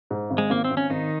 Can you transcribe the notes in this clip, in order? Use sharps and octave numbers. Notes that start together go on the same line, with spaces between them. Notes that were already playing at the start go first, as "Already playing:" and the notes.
G#2
G#1
G#3
G#1 A#3
C4
G#1
C#4
G#1 D#3 D#4